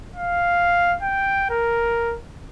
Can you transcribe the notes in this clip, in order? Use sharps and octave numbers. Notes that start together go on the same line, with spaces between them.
F5
G5
A#4